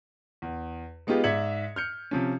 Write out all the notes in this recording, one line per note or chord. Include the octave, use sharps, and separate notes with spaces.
E2
G#3 B3 D#4 F4 G4 G#4
G#2 D5 E5 G#6 C#7 F#7
F6 G6 C#7
C3 F3 C#4